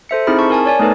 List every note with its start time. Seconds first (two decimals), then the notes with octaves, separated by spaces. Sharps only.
0.09 A4 C5 E5 C#7
0.27 C4 D#4 E4 G#4 B5
0.39 A5 C#6
0.50 A#4 G#5 A5
0.66 C#5 D5 G#5
0.79 A3 B3 D#4 A4 B4